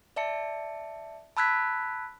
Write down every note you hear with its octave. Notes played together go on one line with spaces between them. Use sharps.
D5 E5 A5 C#7
A5 B5 E6 F#6 G#6 B6